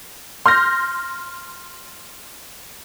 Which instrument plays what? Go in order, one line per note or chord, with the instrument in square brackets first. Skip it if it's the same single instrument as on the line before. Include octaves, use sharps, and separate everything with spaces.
[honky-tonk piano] C6 F6 G6 A#6